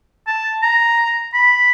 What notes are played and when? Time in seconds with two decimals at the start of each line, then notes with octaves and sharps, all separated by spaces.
0.27 A5
0.63 A#5
1.34 B5